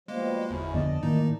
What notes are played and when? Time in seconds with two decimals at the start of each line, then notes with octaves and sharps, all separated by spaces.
0.08 B2 F3 G3 G#3 A#3
0.50 G1 E2 C#4 E4
0.74 F2 D3 B3 D5 D#5 A5
1.03 A2 D#3 E3 A#3 D#4